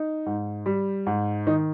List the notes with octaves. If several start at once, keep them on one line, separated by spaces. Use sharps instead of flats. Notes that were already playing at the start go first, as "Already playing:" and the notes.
Already playing: D#4
G#2
G3
G#2
D#3 D#4